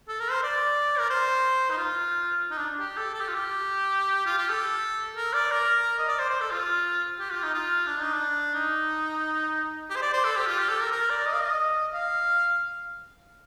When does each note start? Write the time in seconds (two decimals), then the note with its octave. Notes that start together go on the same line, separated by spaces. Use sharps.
0.08 A4
0.20 A#4
0.31 C5
0.43 D5
0.99 A#4
1.10 C5
1.70 D#4
1.78 F4
2.51 D#4
2.58 D4
2.79 G4
2.97 A4
3.14 A4
3.21 G4
3.28 F4
3.35 G4
4.26 F4
4.38 G4
4.50 A4
5.16 A#4
5.33 D5
5.51 A#4
5.98 D#5
6.08 D5
6.19 C5
6.30 C5
6.41 A4
6.51 F4
7.19 G4
7.31 F4
7.43 D#4
7.54 F4
7.87 D4
8.01 D#4
8.13 D4
8.55 D#4
9.90 G4
9.96 C5
10.02 D5
10.13 C5
10.24 A4
10.36 G4
10.47 F4
10.59 G4
10.69 A4
10.81 A#4
10.92 A#4
11.10 D5
11.26 D#5
11.33 F5
11.40 D#5
11.94 F5